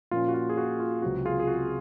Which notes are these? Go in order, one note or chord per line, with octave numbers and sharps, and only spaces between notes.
A#2 F3 A#3 C#4 F4
F#4
F4
G#4
F#4
F4
C#2 C3 F#3 C4 F#4
F4 G#4
G#4
F#4